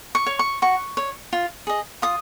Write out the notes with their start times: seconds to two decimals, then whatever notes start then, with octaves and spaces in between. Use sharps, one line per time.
0.15 C#6
0.26 C#5
0.39 C#6
0.62 F#4 C#6
0.97 C#5
1.33 F4
1.67 G#4 D#5
2.02 F4 D#6